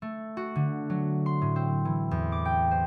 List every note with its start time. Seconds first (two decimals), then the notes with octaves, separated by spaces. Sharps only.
0.02 A3
0.37 F#4
0.55 D3
0.90 F#3
1.26 C6
1.42 A2
1.56 C4
1.85 E3
2.11 E2
2.32 D6
2.45 G5
2.71 C5